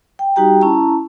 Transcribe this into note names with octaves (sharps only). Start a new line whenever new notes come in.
G5
G3 D#4 F#4 G4 G5 A#5
C#4 E4 A5 A#5